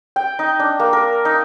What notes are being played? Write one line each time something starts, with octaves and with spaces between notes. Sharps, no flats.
G5
D#4
D4
A#3
A#4
D#4